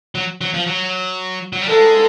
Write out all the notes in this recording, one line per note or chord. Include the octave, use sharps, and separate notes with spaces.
F#3
F#3
F3
F#3
F#3
G3
G#3 A4